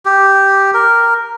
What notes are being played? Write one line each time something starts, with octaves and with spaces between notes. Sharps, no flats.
G4
A#4